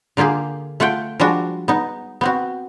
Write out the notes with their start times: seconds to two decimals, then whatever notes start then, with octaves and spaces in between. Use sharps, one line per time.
0.17 D3 A#3 F4 G4 G#4
0.80 A3 F4 F#5 G5
1.20 F3 G3 G#3 D4 F#4
1.68 B3 D#4
2.21 B3 C4 F#4